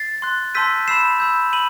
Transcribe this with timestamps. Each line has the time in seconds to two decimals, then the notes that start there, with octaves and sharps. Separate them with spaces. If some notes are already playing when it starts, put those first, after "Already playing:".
Already playing: A6 C7
0.22 C6 F#6
0.55 A5 C6 E6 G6 B6 D#7
0.88 B5 E6 G6 C7 E7
1.20 B5 E6 G6
1.53 B5 D#7 F#7